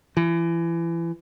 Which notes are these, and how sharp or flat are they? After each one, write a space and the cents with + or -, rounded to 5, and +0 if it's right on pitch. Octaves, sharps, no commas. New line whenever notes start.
E3 +30